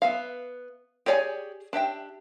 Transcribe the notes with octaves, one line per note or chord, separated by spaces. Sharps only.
B3 E5 F5
G4 G#4 C#5 D5 G#5
D4 G4 E5 G5